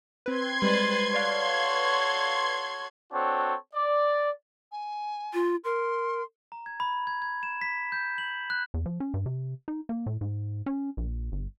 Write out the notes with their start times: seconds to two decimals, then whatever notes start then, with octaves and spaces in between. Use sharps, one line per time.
0.26 C4 B4 C6 G#6
0.62 G3 G#3 B4 C5 A6
1.13 F#4 A4 B4 C#5 D5 F5
3.12 C4 D4 F#4 A4 C#5
3.74 D5
4.72 G#5
5.34 F4
5.64 A#4 C6
6.52 A#5
6.66 G#6
6.80 B5
7.07 G#6
7.22 G#6
7.43 E7
7.61 B6
7.92 G6
8.18 F#7
8.50 F#6
8.74 E2
8.86 F3
9.00 C#4
9.14 G2
9.26 C3
9.68 D#4
9.89 A#3
10.06 A2
10.21 G#2
10.66 C#4
10.97 A#1
11.32 G1